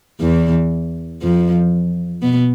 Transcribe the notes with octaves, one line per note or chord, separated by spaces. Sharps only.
E2 E3
F2 F3
B2 B3